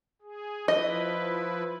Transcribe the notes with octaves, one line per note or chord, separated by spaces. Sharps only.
G#4
F3 E4 B4 D#5